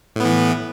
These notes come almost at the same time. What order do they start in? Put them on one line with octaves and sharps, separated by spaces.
A2 B3 E3